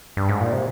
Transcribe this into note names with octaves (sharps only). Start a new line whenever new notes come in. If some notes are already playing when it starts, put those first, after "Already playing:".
G2
G#2
A#2
C3